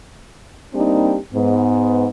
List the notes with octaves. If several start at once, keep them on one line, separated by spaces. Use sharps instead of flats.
G3 A#3 C4 D4 D#4 G4
G#2 B3